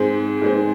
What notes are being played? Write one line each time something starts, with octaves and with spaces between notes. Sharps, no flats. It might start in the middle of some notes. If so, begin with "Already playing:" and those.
Already playing: G#2 G#3 C4
G#2 G#3 C4